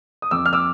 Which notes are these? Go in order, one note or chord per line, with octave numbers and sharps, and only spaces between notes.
D#6
F2 D6 E6
F6
D6 E6